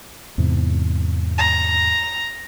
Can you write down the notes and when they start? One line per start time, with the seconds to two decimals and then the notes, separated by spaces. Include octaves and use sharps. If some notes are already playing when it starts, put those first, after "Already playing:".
0.38 E2 G#2 C3
1.38 A#5